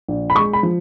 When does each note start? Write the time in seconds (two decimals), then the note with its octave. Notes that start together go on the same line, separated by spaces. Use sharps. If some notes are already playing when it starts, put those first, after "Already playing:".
0.08 A#1
0.30 B5
0.35 G#3 C#6
0.53 B5
0.63 F3